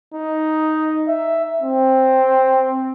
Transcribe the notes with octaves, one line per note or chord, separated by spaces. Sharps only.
D#4
E5
C4